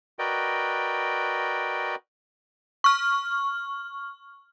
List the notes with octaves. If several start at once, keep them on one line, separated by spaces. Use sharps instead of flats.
F#4 A#4 B4 D5 D#5 G5
C#6 F6